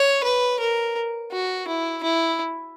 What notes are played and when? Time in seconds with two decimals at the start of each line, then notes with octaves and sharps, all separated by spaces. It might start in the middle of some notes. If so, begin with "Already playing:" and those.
Already playing: C#5
0.24 B4
0.60 A#4
1.32 F#4
1.68 E4
2.03 E4